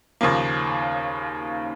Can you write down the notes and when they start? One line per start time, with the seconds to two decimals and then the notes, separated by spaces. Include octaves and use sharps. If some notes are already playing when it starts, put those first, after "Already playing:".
0.21 D#2 C#3 F3 A#3